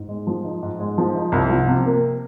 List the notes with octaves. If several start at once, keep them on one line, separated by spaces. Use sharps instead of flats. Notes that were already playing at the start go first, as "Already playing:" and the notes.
Already playing: G#2
G#3
F3
D#4
G#2
G#3
F3
D#4
C2
F3
C3
A#3